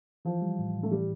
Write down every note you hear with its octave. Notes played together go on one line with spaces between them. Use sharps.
E3 F3
G3
A2
A2
A3
E3 G3